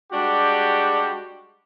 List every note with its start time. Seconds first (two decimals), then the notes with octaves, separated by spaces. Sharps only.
0.13 G3 G#3 D4 F#4 G4